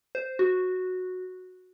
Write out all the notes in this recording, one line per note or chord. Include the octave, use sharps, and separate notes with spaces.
C5
F#4